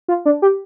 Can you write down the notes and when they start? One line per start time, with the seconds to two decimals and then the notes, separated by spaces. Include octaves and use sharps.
0.08 F4
0.26 D4
0.42 G4